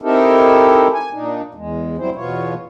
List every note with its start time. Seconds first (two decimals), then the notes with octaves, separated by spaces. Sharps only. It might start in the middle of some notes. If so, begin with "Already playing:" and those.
0.02 C4 D#4 E4 G4 A4 A#4
0.93 G#5
1.13 A#2 D4 D#4
1.55 E2 G#3
1.98 F#3 G3 C4 E4 C5
2.16 E2 B2 B3 F4 C#5